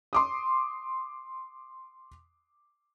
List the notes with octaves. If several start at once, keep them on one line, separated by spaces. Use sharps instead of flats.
C6 D6 D#6